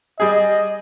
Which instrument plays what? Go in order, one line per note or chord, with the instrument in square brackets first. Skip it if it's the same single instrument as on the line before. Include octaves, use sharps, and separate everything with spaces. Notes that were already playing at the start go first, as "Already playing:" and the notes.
[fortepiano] G3 G#4 [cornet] D#5